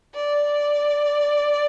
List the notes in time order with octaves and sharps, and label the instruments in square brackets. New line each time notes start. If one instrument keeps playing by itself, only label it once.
[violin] D5